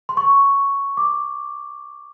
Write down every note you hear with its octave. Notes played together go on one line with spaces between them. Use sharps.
C6
C#6
D6